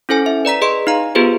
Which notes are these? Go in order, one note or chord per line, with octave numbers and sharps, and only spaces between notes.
C#4 E4 A4 C5 G#5
E5
B4 D5 A#5 B6
G#4 B4 D#5 C6
D#4 F5 A#5
B3 F4 G4 G#4 B4 C5